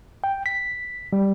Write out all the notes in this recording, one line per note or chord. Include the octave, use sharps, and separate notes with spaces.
G5
B6
G3